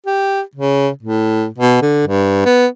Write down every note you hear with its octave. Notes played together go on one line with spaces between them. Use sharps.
G4
C#3
A2
B2
D3
G2
B3